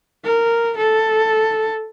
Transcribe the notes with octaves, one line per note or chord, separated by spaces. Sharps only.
A#4
A4